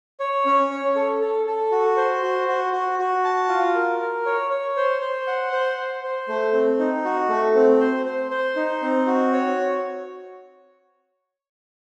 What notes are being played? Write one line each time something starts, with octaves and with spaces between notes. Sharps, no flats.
C#5
C#4
C#5
A4
A4
A4
F#4
C5
F#4
F#4
F#4
F#4
A5
F4
A#4
A#4
C#5
C#5
C5
C5
F#5
C5
C5
C5
A3
C4
D#4
F#4
A3
C4
C5
C5
C5
D#4
C4
F#4
C#5